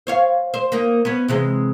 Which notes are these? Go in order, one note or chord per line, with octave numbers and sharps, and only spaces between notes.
C5 C#5 F5
C5
A#3 D#4
B3 C#4
C3 E3 G#3